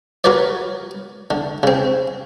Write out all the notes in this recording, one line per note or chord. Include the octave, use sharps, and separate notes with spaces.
F#4 A#4 B4 C#5 D5
D3
C#3 C4